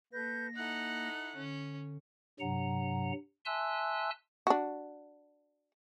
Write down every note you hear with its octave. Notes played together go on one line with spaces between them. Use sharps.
A#3 A4 B4 G6 A#6
D#4 E4 A4 F#5 F#6
D3 C#4
G2 C3 F#3 F#5 A#5
E5 G#5 A5 C6 E6 F#6
D4 F#4